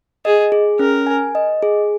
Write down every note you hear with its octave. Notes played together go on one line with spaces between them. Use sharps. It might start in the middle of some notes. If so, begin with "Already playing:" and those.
G#4 D#5
G#4
C#4 A#4
G#5
D#5
G#4